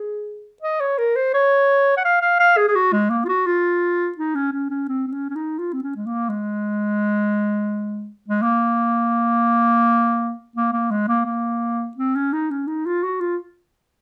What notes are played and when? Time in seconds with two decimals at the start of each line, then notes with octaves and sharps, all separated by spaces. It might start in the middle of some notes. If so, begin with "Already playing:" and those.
Already playing: G#4
0.62 D#5
0.80 C#5
0.98 A#4
1.16 C5
1.34 C#5
1.97 F#5
2.05 F5
2.22 F5
2.40 F5
2.57 G#4
2.68 G#4
2.75 F#4
2.93 G#3
3.10 A#3
3.25 F4
3.28 F#4
3.46 F4
4.18 D#4
4.35 C#4
4.52 C#4
4.70 C#4
4.89 C4
5.07 C4
5.12 C#4
5.30 C#4
5.36 D#4
5.59 F4
5.73 C4
5.83 C#4
5.96 G#3
6.06 A#3
6.29 G#3
8.28 G#3
8.42 A#3
10.56 A#3
10.73 A#3
10.91 G#3
11.08 A#3
11.26 A#3
11.97 C4
12.15 C#4
12.33 D#4
12.51 C#4
12.68 D#4
12.86 F4
13.03 F#4
13.21 F4